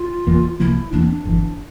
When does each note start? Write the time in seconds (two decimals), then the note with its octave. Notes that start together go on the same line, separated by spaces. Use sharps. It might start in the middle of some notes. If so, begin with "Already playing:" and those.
Already playing: F4
0.27 F1 E2 E3 A#3
0.60 C2 C3 F3 A#3 E4
0.92 E1 E2 E3 A#3 D4
1.01 C4
1.09 D4
1.25 G1 F2 E3